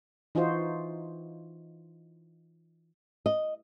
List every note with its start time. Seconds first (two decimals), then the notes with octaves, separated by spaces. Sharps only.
0.35 E3 D#4 F4 F#4 C5
3.26 D#5